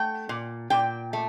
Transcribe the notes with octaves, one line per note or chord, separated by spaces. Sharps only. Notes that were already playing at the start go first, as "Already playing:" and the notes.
Already playing: A3 G5
A#2
A#2 G5
A3